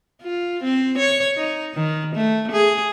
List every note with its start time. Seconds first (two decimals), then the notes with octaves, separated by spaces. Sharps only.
0.22 F4
0.63 C4
0.98 C#5
1.37 D#4
1.74 D#3
2.16 A3
2.52 G#4